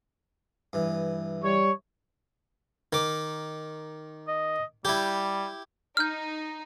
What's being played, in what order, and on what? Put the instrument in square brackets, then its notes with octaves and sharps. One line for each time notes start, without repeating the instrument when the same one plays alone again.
[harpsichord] G2 E3
[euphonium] G3 [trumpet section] C#5
[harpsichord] D#3 D6
[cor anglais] D#5
[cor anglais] G3 [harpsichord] E4 G4
[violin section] D#4 [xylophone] F6 G6